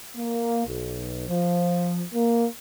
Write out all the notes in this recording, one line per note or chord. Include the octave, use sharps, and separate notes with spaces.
A#3
B1
F3
A#3